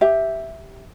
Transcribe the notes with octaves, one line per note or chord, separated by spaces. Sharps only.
G4 E5